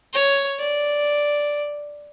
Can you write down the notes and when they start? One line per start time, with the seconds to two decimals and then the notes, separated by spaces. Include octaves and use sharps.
0.14 C#5
0.60 D5